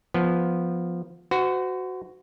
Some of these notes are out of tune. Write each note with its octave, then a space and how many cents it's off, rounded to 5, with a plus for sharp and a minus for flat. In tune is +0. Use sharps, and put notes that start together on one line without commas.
F3 +0 B3 -5
F#4 +0 C5 -40